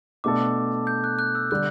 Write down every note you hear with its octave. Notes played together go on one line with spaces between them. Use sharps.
B2 A3 D4 A4 D6
G6
F#6
F#6
E6
D3 G3 F#6